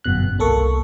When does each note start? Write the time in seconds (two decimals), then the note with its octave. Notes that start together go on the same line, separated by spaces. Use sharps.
0.04 G1 F#2 B2 F#6
0.39 C2 A#3 A4 C#6